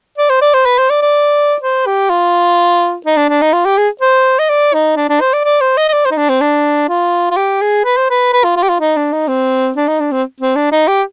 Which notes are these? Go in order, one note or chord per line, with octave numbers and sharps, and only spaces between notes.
D5
C5
D5
C5
B4
C5
D5
D5
C5
G4
F4
D#4
D4
D4
D#4
F4
G4
G#4
C5
D#5
D5
D#4
D4
D4
C5
D5
D5
C5
D#5
D#5
D5
C5
D#4
D4
C4
D4
F4
F4
G4
G#4
B4
C5
B4
B4
F4
F4
G4
F4
D#4
D4
D#4
C4
D4
D#4
D4
C4
C4
D4
D#4
G4